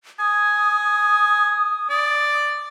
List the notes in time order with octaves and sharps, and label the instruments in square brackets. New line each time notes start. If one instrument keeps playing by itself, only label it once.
[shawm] G#5 [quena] D#6
[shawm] D5